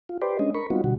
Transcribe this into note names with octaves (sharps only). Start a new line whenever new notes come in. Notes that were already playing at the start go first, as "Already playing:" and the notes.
F4
G4 B4 C5 D5
G#3 C#4 D4 D#5
A#4 B5 C#6
G3 B3 C4 D#4 F4 F#4
B2 D3 G3 F#4